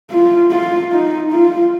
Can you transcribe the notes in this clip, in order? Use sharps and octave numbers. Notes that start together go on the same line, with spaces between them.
F4
F4
D#4
F4